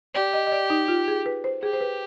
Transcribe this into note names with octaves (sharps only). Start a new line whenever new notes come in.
G4 D5
D#5
D#5
D5
D#4
F4
G#4
B4
C5
G4 G#4
C5
B4